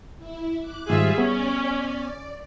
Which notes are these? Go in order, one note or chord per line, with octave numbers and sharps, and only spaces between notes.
E4
D6 F#6
G#2 D#3 G3 F4 G#4 E5
B3 C#4 D5